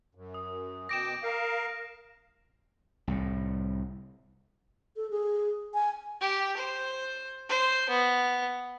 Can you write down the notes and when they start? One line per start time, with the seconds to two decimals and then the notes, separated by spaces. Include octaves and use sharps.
0.15 F#2
0.34 D#6
0.89 B2 G5 D6 A#6 D7 E7
1.23 A#4 F5
3.07 C2 A2
4.96 A4
5.10 G#4
5.74 G#5
6.21 G4
6.57 C5
7.49 C5
7.89 B3